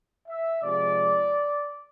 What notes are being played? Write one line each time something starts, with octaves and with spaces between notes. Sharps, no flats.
E5
C3 F3 G#3 D5